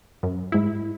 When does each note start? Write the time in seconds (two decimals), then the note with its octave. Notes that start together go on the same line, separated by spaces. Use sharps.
0.23 F#2
0.52 G#2 E4